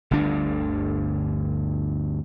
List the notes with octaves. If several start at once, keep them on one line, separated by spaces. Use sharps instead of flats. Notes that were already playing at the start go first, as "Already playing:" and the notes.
G1 D2 G2 D4